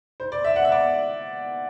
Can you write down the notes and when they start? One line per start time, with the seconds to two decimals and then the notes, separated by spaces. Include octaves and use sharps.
0.20 C5
0.32 D5
0.45 E5
0.56 F#5
0.65 E5
0.72 D5